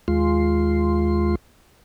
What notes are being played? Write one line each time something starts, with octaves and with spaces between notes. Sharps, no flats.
D#2 G#3 F4 C6